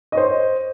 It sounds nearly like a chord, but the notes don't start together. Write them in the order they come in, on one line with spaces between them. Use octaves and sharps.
D#5 C#5 C5